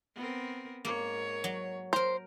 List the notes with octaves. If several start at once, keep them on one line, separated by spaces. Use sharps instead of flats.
B3 C4 A#4
G#2 A#3 C#5
F#3
A#4 C5 A#5